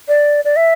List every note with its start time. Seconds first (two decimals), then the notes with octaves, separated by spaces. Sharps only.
0.08 D5
0.45 D5
0.56 E5